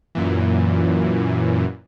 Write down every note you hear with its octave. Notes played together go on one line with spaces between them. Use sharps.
F#2 A#2 E3